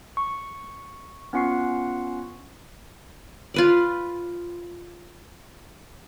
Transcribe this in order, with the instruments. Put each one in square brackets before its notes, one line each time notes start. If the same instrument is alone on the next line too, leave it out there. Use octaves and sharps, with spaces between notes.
[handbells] C#6
B3 C#4 F4 F#5 C#6 C7
[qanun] F4 B4 D5